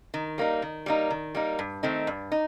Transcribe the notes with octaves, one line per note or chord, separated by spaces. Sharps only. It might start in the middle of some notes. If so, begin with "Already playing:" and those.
D#3
G3 A#3 D#4
D#3
G3 A#3 D#4
D#3
G3 A#3 D#4
G2
D#3 A3 C4 D#4
G2
D#4